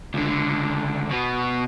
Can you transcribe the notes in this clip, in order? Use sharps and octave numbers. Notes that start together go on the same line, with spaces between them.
C#2 D3
B2 B3